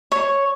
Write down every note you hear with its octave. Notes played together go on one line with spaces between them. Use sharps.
C#5